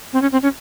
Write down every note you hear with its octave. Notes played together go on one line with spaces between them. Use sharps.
C4
C#4
C4
C#4